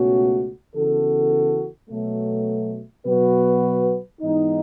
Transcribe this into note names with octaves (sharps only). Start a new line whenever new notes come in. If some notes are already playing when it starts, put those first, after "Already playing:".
Already playing: C#2 B2 A3 C#4 F#4
C#3 E3 B3 F#4 A4
B2 F#3 A3
B2 F#3 B3 F#4 B4
G#2 E3 B3 D#4